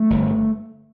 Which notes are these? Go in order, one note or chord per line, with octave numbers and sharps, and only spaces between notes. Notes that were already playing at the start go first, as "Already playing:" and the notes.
Already playing: A3
G1